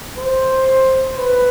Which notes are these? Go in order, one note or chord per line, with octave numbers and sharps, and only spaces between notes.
C5
B4